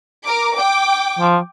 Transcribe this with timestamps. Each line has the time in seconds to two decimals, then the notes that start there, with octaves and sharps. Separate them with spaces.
0.25 A#4 D6
0.54 G5 D6
1.19 F3